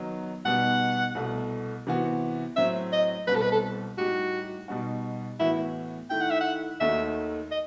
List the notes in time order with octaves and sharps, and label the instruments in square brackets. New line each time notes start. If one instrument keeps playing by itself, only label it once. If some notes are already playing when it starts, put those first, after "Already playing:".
Already playing: [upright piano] D#3 F#3 B3 D#4
[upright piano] B2 G3 B3 D#4 [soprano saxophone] F#5
[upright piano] C2 B2 A3
C3 E3 B3 F#4
[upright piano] A2 F#3 C4 [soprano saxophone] E5
[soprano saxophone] D#5
[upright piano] C2 B2 G3 C4 [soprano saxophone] B4
[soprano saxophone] A4
B4
A4
[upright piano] A2 G3 D#4 G4 [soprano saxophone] F#4
[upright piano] B2 G3 D#4 F#4
[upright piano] A2 E3 B3 F#4 [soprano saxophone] E4
[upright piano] D#3 A3 E4 [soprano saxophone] G5
[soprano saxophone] F#5
E5
F#5
[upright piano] D#2 D#3 A3 D#4 F#4 [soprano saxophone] E5
[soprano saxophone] D#5